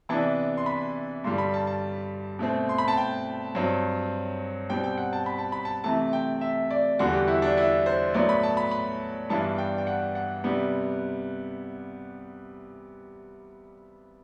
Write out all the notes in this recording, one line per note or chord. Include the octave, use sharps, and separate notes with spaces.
C3 E3 B3 D4 A5
C6
B5
G2 D3 G3 C6
B5
A5
A5
B2 A3 C4
C6
B5
A5
G5
G2 F#3 C4
B2 G3 C4 G5
G5
F#5
A5
B5
A5
B5
A5
C3 E3 A3 A5
G5
E5
D5
E2 D3 G3 F#4
G4
E4
D4
E4
C5
A2 F#3 B3 D5
B5
A5
B5
B5
G2 E3 G3 B3 D4 A5
G5
G5
F#5
F#5
C3 G3 B3